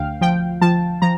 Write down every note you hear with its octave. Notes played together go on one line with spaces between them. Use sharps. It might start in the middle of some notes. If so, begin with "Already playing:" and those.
Already playing: D2 F5 G5
F3 G5
F3 A5
F3 A#5